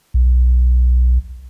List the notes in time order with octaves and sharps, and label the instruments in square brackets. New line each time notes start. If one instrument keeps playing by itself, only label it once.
[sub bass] B1